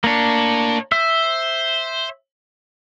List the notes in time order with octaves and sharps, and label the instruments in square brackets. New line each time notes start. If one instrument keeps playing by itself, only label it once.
[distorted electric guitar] A2 C#5 [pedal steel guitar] A#3 D4
[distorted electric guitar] C5 [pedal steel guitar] E5